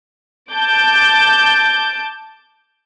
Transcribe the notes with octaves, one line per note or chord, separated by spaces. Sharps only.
A5 D6 G6